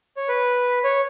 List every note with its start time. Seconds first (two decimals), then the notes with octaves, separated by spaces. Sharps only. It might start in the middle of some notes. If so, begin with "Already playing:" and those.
0.17 C#5
0.28 B4
0.84 C#5